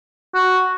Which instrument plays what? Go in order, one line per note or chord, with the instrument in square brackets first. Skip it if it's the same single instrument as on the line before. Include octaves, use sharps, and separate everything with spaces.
[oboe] F#4